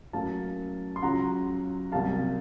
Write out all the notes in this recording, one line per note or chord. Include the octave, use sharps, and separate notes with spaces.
A2 F#3 A#3 C#4 F5 A5
C6
C#2 C#3 F#3 F#5 A#5
C2 C3 F#3 A#3 F5 A5